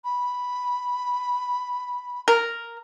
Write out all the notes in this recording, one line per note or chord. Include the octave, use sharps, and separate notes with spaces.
B5
A#4